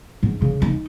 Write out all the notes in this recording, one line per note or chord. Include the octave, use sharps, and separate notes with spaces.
G#2
C#3
D#4